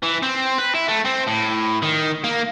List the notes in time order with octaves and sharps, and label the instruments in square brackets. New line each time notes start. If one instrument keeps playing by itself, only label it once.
[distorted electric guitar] E3
C4
B4
E4
A3
C4
A2
D#3
A#3